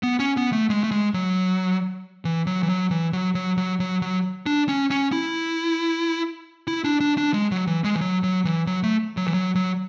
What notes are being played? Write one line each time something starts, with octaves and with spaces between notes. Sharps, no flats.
B3
C#4
B3
A3
G#3
A3
G#3
F#3
E3
F#3
E3
F#3
E3
F#3
F#3
F#3
F#3
F#3
D4
C#4
C#4
E4
E4
D4
D4
D4
G#3
F#3
E3
G#3
E3
F#3
F#3
E3
F#3
A3
F#3
E3
F#3
F#3